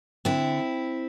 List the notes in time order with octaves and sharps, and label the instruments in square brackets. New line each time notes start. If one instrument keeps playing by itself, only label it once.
[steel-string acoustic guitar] D3 C4 E4